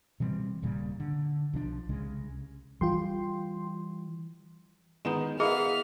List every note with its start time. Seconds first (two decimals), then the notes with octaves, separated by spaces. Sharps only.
0.20 B2 E3 G3 C4
0.62 D#1 A#2 C#3 G3
1.00 D3
1.53 B1 F3 D4
1.89 C2 C#3 G#3
2.81 E3 G3 F4 G5 C6
5.05 D#3 G#3 B3 D#4 E7
5.40 B3 E4 G#4 A#4 D#5 F5 F6